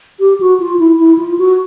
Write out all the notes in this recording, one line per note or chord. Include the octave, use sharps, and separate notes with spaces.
G4
F#4
F4
E4
E4
F4
F#4